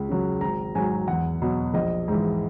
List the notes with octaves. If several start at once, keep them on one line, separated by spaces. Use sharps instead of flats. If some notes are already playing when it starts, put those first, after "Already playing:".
Already playing: C#2
C#3 F#3
G#1 A#5
G#2 F#3 G#5
E2 F#5
B2 F#3
A#1 D#5
G#2 E3